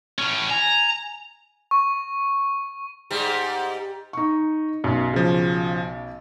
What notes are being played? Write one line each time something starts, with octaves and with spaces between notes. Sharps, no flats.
A2 C#4
G#5 A#5
C#6
G#2 G3
D#4 C#6
B1 F#2
C#3 F3